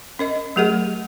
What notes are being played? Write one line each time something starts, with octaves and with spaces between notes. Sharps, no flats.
C#4 A#4 D#5
F#3 A3 G4 G#4 A#4 F#5